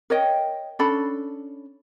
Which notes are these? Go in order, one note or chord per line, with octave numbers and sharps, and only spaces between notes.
A#4 C#5 D#5 G5
C#4 D4 A4 B5